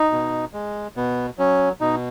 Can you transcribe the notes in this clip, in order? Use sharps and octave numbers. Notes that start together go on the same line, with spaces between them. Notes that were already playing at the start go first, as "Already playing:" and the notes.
Already playing: D#4
B2
G#3
B2 B3
F#3 C#4
B2 D#4